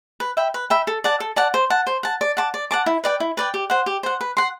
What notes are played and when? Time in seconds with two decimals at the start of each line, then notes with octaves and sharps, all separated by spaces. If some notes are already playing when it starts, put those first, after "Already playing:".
0.20 B4
0.37 E5 G5 B5
0.54 B4
0.70 E5 G5 B5
0.87 A4
1.04 D5 F#5 A5
1.20 A4
1.36 D5 F#5 A5
1.54 C5
1.70 F#5 A5
1.87 C5
2.03 F#5 A5
2.21 D5
2.37 F#5 A5 D6
2.54 D5
2.71 F#5 A5 D6
2.86 E4
3.04 B4 D5 G5
3.20 E4
3.37 B4 D5 G5
3.54 G4
3.70 C5 F#5
3.86 G4
4.03 C5 F#5
4.21 B4
4.37 F#5 C6